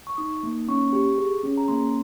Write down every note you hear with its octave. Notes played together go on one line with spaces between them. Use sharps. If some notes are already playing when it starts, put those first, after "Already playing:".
C#6
D#4 D#6
A#3
C#4 C#6
G4
G#4
C#4
A#5
A#3 C6